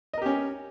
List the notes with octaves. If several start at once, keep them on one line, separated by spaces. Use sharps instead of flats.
C#4 G4 A#4 D#5